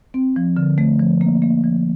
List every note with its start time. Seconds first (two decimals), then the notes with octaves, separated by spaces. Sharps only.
0.14 C4
0.36 F3
0.57 D3
0.78 A3
0.99 F3
1.21 A#3
1.42 A#3
1.64 F3